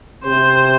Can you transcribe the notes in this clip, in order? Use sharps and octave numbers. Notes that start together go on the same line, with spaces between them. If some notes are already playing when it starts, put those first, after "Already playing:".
C3 C5